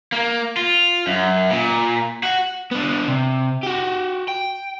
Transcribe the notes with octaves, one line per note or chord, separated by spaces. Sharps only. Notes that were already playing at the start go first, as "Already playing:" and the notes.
A#3
F4
F#2
A#2
F#4
B3 D4
C3
F#4 G4
G5